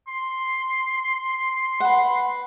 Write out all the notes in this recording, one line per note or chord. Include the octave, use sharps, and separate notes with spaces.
C6
B4 F#5